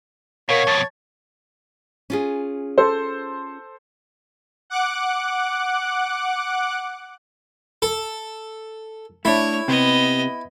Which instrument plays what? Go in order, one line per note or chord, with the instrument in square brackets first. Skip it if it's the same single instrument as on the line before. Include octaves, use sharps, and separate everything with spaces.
[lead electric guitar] B2 [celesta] A#4 F5 [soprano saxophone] C#5
[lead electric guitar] F2 B2 [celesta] A5 A6
[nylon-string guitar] C#4 F4 G#4
[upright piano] A4 C5
[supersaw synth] F#5 D6 F#6
[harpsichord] A4
[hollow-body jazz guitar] A3 D4 [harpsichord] E4 [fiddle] C#5
[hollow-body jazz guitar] C3 [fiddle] B3 D#5